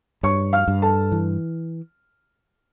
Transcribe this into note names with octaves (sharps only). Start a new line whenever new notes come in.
G2 C#5 C#6
F5 F6
G2
A4 A5
E3